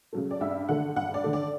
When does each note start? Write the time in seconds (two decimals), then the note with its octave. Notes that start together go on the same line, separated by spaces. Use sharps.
0.13 C#3 F#3 A3
0.31 D5
0.41 G2 E5
0.69 D3 A3 F#5
0.96 G2 F#5
1.14 D5
1.24 D3 A3
1.33 D5